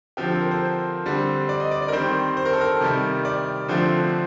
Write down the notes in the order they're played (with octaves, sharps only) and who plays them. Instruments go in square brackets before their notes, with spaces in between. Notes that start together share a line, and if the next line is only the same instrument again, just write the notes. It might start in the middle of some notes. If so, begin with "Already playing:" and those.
[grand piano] D3 F3 C4 G4
A4
A#4
C5
D3 G3 C4
D5
D#5
D5
D5
A#4
D#3 G3 C4 C5
C5
A#4
A4
A#4
C3 D#3 G3
D5
D3 F3 A3 C4